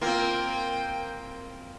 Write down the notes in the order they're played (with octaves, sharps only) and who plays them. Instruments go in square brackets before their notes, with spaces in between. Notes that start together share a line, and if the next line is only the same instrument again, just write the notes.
[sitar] A#3 C4 [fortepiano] F4 [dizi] G5